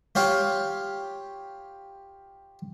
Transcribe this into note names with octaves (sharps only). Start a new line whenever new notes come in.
F4 G4 C#5 F5